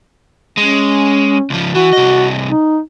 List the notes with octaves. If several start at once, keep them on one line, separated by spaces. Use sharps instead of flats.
G#3 C#4
C#2 F3
E3 F#4
C2 D#5
D#4